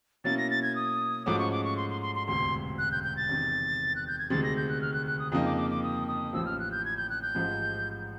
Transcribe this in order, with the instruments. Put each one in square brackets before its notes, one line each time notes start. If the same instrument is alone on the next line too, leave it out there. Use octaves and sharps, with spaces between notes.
[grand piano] B2 F#3 A#3 C#4 E4 [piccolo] A6
[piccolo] A#6
A6
G#6
D#6
[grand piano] G#2 F3 A3 C#4 F#4 [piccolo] D6
[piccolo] C#6
D6
C#6
C6
C6
C6
C6
[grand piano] E1 D2 C3 [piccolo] C6
[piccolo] F#6
G6
G6
A6
[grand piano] E2 C3 D#3
[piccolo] F#6
G6
G#6
[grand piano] D2 C3 D#3 G#3 [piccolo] A6
[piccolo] A#6
G6
F#6
F6
F#6
F#6
D#6
[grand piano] F2 C#3 F3 A#3 D#4 [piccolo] D#6
[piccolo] D6
D6
D6
D#6
D#6
[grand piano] A1 A2 F3 [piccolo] E6
[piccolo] F6
F#6
G6
G#6
G6
F#6
G6
[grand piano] A1 G#2 F3